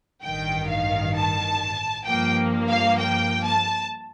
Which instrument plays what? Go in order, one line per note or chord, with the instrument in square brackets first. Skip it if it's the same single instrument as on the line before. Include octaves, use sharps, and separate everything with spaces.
[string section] A1 G2 D#3 G5
F5
A5
G2 F3 A#3 G5
F5
G5
A5